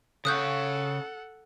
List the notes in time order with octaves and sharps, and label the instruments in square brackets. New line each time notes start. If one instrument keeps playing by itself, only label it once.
[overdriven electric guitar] C#3 C#5 [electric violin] A4 F#5 [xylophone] D#6 F#6 G6